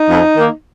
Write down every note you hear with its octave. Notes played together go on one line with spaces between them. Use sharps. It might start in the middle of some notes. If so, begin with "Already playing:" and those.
Already playing: D#4
F2
D#3 A#3